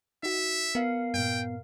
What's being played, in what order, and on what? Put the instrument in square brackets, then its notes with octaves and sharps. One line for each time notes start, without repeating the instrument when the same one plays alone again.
[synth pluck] D#4 F#4 [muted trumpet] E5
[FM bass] B3 [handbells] A#4 F5 [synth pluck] C#7
[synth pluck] G2 A#2 [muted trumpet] G5